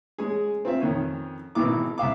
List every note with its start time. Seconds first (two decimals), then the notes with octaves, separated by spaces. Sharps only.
0.18 G#3 C#4 G#4
0.65 C4 F4 E5
0.81 F2 D#3 C#4
1.55 G#1 B2 D#3 E3 D6
1.98 C2 E5 F5 D6